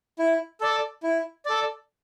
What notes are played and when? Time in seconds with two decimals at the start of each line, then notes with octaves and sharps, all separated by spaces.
0.19 E4
0.61 A4 D5
1.03 E4
1.45 A4 D5